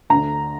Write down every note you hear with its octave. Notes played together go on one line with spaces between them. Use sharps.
D2 D3 A#5